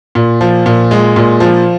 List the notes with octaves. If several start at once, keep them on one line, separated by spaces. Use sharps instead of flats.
A#2
F3
A#2
G#3
A#2
F3